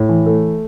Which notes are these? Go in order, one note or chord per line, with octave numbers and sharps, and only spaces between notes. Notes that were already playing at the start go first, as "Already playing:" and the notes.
Already playing: A2
E3
A3